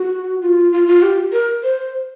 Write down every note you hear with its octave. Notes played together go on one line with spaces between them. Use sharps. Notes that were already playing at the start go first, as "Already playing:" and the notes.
Already playing: F#4
F4
F4
F4
G4
A#4
C5